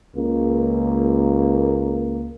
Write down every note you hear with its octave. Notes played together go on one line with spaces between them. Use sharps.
C#2 A#3